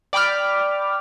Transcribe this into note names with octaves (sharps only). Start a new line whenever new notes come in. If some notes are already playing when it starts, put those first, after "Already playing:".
D5 G5 B5 D6 F6